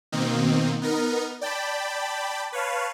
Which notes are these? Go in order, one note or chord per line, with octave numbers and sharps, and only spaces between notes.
B2 D#3 A#3 C4 D#4
B3 D#4 A#4
D5 G5 A5 B5
B4 C#5 F5 A5